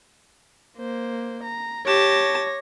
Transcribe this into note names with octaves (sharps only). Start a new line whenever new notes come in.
A#3 C5
A#5
G4 C#5 A5 A#6